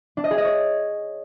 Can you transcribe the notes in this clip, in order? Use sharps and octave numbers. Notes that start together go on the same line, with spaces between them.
D4
D#5
G#4
D#5
C#5